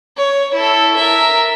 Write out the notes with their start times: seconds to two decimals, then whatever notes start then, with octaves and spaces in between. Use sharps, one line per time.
0.17 C#5
0.54 E4 A4
0.96 A#4 E5